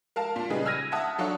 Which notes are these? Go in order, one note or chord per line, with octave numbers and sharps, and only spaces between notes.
A#4 F5 A5
A#2
C#3 G3 D#4 G#4 B4
E6 F6 G#6 A#6 D#7
E5 F#5 A5 D#6
F#3 D4 A4 C#5 F5 F#5